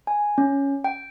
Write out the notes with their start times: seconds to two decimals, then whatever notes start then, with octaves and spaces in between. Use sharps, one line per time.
0.07 G#5
0.38 C#4
0.84 G5